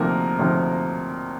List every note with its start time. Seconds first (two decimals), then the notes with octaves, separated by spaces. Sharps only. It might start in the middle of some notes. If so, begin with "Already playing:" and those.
Already playing: D2 C3 F3 A#3 D#4 A#4
0.39 D2 C3 F3 A#3 D#4